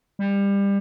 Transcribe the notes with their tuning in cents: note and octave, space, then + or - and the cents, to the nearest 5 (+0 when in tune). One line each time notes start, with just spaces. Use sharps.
G3 +25